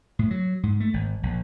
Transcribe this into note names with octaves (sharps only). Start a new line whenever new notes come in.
A2
F#3
G#2
A3
G#1
A#1